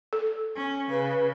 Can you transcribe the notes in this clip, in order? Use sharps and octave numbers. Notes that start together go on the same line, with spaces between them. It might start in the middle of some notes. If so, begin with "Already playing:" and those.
A4
C#4
C#3 B4